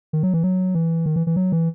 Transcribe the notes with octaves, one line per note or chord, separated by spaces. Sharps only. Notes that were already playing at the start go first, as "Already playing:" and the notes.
D#3
F#3
E3
F#3
E3
D#3
E3
E3
F#3
E3